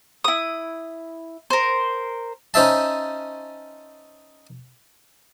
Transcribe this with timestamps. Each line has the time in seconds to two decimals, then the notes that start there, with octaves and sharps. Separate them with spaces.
0.24 E4 D#6
1.50 A#4 C5
2.54 C#4 D#4 C5 E5 A5